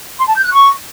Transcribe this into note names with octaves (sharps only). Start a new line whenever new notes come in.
C6
A5
G6
F#6
C#6